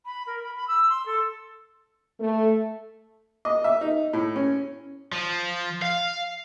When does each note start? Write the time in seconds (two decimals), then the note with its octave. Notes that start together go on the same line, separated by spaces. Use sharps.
0.06 B5
0.27 A#4
0.43 B5
0.56 B5
0.68 E6
0.90 C6
1.06 A4
2.20 A3
3.45 D#5
3.64 E5
3.81 D#4
4.13 A2
4.36 C#4
5.12 F3
5.82 F5